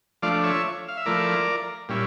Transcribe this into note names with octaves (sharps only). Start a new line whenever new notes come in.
F3 A3 D4 D5 F5
C#5 E5
F5
E5
F3 A3 E4 A#4 D5
A#2 G3 C#4 E4